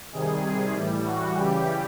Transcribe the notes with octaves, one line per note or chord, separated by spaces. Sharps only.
C3 D#3 G3 G#4
A2 E3 G3
F#4
C#3 E3 G3 G4